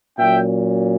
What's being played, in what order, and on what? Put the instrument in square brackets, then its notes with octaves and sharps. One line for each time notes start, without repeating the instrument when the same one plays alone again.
[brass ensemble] A#2 F#3 C#4 E5 G5